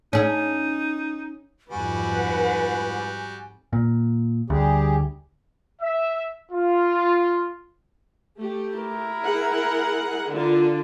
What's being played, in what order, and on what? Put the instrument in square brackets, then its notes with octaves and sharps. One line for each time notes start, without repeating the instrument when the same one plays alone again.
[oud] C#4 G#4 [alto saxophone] D#4
[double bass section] F2 G#2 [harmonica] G3 F#4 [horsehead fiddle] B4 F#5 [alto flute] G#5
[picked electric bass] A#2
[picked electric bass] D2 [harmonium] G3 G4 G#4
[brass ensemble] E5
F4
[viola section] A3 G4
[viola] E4 A#4
[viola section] G#4 F#5
D3 F4